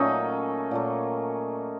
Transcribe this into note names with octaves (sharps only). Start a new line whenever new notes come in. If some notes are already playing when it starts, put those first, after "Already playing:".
Already playing: A#2 F#3 A3 C#4 D#4
A#2 F#3 A3